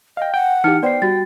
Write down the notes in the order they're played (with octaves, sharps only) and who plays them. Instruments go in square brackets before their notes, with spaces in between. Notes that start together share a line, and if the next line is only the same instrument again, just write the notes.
[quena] D#5 [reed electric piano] F5 G5
[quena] F#5 [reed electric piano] G5
[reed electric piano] E3 G4 [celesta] D#4 F6 C#7
[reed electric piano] B3 C5 [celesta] D5 C7 [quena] G5
[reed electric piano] G3 [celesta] F#4 A6